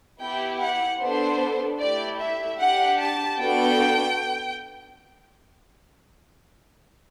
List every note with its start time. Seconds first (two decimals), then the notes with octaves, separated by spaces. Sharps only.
0.21 B3 E4 G4 G5
0.61 F#5
1.01 B3 D4 A4 C5
1.80 A3 E4 G4 D5
2.20 E5
2.60 D4 G4 F#5
3.00 A5
3.40 B3 D4 F#4 A4 G5